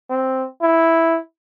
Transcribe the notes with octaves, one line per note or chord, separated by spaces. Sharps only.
C4
E4